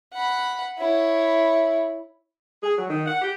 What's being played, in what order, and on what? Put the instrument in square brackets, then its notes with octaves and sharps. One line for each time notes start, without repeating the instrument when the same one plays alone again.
[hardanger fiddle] F#5 B5
E4 C#5
[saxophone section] G#4
F#3
D#3
F#5
G4